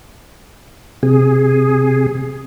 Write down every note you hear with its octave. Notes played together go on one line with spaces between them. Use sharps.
C3 G#4